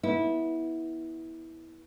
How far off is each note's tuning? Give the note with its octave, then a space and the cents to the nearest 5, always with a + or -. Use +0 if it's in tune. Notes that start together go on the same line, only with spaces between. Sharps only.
B3 -15 E4 -20